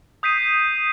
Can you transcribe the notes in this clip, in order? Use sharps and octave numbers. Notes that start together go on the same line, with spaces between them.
D#6 G6 B6 C7 D#7